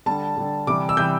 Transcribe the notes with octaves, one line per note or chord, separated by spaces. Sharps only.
D3 G3 A5
D3 G3
C3 E3 G3 D6
E6
C3 E3 G3 G6